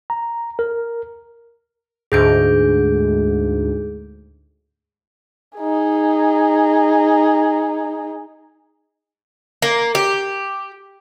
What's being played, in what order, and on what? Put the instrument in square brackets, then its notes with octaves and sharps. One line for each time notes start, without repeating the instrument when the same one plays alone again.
[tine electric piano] A#5
A#4
[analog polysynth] D2 G#2 [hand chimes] G#4 G6 D7
[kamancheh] D#4 G#4
[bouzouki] A#3
G4